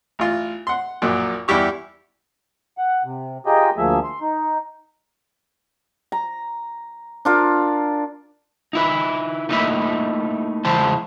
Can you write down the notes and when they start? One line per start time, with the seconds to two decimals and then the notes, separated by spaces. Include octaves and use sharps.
0.19 A1 F4
0.67 F#5 C6
1.02 A#1 F#2 A#2
1.48 E2 G3 E4 G4 C#6
2.78 F#5
3.04 C3
3.46 F4 G4 G#4 A#4 D#5 G5
3.77 D2 F3 A3 A#3 G#4 E5
4.04 C6
4.21 D#4
6.12 A#5
7.25 D4 F4 A#4
8.73 D#4 E4 B4
9.49 A3 A#3 D#4 E4 B4 E5
10.65 E2 C#3 G#3 E4 C5 A5